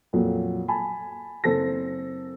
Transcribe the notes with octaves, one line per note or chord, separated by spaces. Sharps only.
F2 A#2 F#3
G#5 A5 B5
F#1 C4 A4 A#6